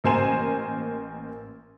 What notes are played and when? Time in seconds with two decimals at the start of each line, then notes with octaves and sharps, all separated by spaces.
0.04 A1 A#3 C5 G#5 A#5 E7